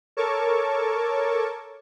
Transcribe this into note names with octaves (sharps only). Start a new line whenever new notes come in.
A4 A#4 C#5 A5 C#6 D6